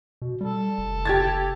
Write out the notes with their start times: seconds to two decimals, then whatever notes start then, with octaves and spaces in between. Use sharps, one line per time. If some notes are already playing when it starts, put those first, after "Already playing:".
0.22 B2
0.41 G3 A4
0.78 F1
1.05 G4 G#6 A6